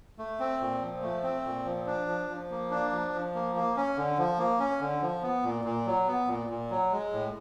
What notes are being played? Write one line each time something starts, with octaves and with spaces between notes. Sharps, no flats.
A3
C4
A#2
F3
A3
C4
A#2
F3
D4
F3
F3
A#3
D4
F3
F3
A#3
A#3
C#4
D3
F3
A#3
C#4
D3
F3
B3
A#2
A#2
F#3
B3
A#2
A#2
F#3
G#3
A2